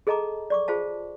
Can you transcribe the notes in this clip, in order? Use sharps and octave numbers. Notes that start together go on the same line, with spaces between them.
G#4 A4 D#5 A5 A#5 D6
D5 C#6 D6
F4 G#4 C5 F5 A5